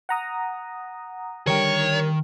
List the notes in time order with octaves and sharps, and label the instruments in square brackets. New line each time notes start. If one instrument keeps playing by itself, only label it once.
[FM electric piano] F#5 A#5 D#6
[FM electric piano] D3 G3 A#4 [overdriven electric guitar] D#3 G5 [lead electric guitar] C#5